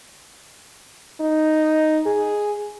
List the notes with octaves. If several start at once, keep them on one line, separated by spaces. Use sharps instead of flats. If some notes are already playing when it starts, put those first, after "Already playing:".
D#4
G#4